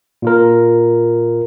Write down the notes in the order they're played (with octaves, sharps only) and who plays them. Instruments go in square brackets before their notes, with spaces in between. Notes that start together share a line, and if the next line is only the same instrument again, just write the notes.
[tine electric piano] A#2 F4 A#4